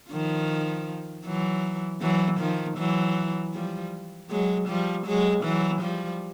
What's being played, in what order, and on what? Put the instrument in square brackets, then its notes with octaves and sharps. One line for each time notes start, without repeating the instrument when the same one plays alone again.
[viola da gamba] D#3 F3
E3 F#3
E3 F#3
D#3 F3
E3 F#3
F3 G3
F#3 G#3
F3 G3
F#3 G#3
E3 F#3
F3 G3